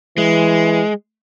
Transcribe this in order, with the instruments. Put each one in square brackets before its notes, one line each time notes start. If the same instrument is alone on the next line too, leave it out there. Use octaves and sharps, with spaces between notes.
[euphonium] E3 [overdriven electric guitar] G#3